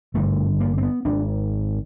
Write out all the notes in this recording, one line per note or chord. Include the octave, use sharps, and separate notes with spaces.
G#1 G2 D3 A3
A#3
C4
B3
G#1 G#2 D4